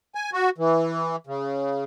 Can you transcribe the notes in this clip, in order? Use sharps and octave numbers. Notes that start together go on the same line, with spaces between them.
G#5
F#4
E3
C#3